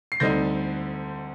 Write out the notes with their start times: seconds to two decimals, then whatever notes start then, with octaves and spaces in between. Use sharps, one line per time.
0.12 C7
0.20 D2 D3 G3 C4 D#4 G6 A#6